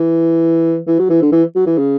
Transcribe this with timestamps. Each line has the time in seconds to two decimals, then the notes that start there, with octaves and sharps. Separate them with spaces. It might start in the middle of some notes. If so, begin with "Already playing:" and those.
Already playing: E3
0.87 E3
0.99 F#3
1.10 E3
1.22 D3
1.32 E3
1.55 F#3
1.66 E3
1.78 C#3